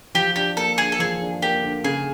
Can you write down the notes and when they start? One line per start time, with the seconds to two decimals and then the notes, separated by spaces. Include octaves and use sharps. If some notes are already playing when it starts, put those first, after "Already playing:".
0.14 F3 G4
0.36 D4 G4
0.57 A#3 A4
0.78 D3 G#4
0.92 A4
0.99 F3 G#4
1.22 D4
1.42 A#3 G4
1.63 D3
1.84 C#3 G#4